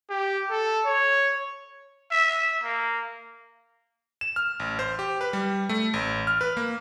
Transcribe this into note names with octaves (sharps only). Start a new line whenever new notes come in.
G4
A4
C#5
E5
A#3
E7
F6
A1
C5
G4
B4
G3
A3
A1
F6
B4
A#3